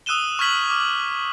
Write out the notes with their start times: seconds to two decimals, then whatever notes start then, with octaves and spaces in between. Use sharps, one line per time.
0.06 D#6 E6 F#6 D#7 E7 G7
0.39 C#6 F6 G#6 B6 F#7 G7
0.70 D6 F6